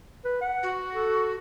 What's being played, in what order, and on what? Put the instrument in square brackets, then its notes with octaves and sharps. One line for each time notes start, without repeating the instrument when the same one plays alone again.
[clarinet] B4
F#5
[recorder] F#4
[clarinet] A4